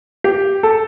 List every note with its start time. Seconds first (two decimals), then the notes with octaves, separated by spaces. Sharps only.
0.24 G4
0.63 A4